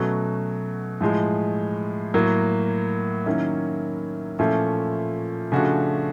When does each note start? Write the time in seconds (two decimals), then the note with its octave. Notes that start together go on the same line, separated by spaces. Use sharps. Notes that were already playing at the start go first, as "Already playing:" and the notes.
Already playing: B2 F#3 A3 C#4
1.01 A2 F3 G#3
2.14 A2 F#3 A#3
3.26 D#3 F#3 A#3 C#4 E4
4.39 A#2 F3 A3 C#4 E4
5.52 C#3 F3 A3 D4 F#4